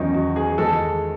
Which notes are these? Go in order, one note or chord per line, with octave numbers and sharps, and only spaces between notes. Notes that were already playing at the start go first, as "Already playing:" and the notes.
Already playing: E2 D#3 F#3 C#4 D#4
F#4
G#4
E2 D#3 G#3 A4